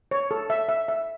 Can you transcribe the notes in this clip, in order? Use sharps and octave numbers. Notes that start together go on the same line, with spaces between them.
C#5
A4
E5
E5
E5